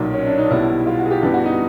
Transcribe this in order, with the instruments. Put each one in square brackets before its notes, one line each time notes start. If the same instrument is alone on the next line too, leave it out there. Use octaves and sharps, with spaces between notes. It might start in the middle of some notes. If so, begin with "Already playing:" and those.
Already playing: [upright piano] B1 A#2 F#3 D#4
C#4
D4
D#4
B1 B2 G3 E4
F4
F#4
G#4
G4
G2 E3 G3 B3 G4
F#4
D#4